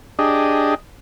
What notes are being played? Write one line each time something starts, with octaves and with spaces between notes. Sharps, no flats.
D4 G4 G#4 D#5